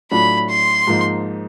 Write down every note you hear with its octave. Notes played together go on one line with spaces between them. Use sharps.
A2 F#3 A3 D4 F4 B5
C6
G#2 F3 A#3 D#4